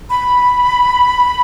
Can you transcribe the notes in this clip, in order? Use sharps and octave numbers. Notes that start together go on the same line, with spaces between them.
B5